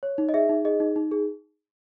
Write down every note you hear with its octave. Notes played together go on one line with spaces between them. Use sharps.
C#5
D#4
D#5
G#4 E5
D#4
G#4 D#5
D#4
D#4
G#4